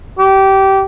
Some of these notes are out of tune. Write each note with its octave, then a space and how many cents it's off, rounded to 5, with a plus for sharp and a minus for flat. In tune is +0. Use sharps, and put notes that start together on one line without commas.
G4 -20